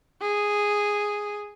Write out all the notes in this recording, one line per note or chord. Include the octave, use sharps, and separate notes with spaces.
G#4